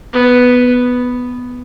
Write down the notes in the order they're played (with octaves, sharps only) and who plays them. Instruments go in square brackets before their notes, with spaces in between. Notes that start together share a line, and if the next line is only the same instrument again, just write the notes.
[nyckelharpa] B3